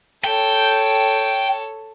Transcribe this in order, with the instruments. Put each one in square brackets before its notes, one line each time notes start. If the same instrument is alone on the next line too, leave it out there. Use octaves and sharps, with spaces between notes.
[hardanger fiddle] A4 C#5 [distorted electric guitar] G5